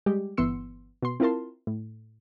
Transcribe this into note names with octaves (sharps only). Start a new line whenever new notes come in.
G3 G#3 G4
G1 E3 B3 C6 E6 C#7
B2 C6
C4 E4 F4 A#4 A5 C6
A2